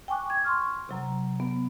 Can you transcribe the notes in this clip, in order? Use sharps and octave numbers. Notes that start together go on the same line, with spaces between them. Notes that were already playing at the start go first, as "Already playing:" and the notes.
G5 G#5 C#6 D6 F#6
G#6
C6 C#6 F6
C3 F#3 A#5
B3